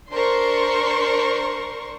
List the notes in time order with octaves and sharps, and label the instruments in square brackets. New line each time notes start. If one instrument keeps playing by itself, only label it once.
[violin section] D4 A#4 C5 C6 C#6